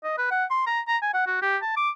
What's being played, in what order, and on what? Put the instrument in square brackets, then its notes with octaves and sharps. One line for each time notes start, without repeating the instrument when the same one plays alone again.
[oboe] D#5
B4
F#5
C6
A#5
A#5
G#5
F#5
F#4
G4
A5
D6